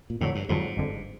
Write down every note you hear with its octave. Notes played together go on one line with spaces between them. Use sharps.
A#2
F2 A2 D3 F#3
G2
F2 G#2 D3 F#3
G1 F2 D3